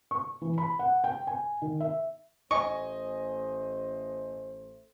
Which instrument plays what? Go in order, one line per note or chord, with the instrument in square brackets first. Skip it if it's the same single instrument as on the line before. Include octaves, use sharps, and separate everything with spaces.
[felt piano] C#6
E3
B5
F#5
G5
G#5
D#3
E5
[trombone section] A1 A3 C5 [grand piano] D#5 G#5 [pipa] C#6